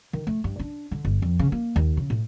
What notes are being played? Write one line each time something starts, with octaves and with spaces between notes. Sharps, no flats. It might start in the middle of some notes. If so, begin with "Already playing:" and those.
D#3
A3
G2
D4
D3
G1
F2
C#3
A#3
D#2
C#3
A2